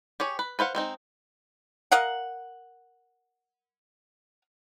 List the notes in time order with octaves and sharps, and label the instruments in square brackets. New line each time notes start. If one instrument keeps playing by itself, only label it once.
[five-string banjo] G4 G#4 C#5
B4
B4 C5 F5 F#5
G#3 C4 D#4
[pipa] A#4 D#5 F5 F#5